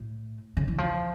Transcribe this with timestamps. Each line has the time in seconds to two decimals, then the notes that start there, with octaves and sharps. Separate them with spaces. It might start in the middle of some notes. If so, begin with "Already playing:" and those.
Already playing: A2
0.57 C#3
0.68 E3
0.78 F3